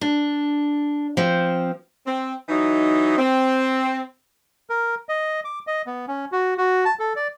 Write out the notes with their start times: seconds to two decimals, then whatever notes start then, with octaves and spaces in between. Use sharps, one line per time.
0.01 D4
1.17 F3 C4
2.06 C4
2.49 E3 F#3 D#4
3.18 C4
4.70 A#4
5.09 D#5
5.45 D6
5.67 D#5
5.86 B3
6.08 C#4
6.32 F#4
6.58 F#4
6.85 A5
6.99 A4
7.16 D5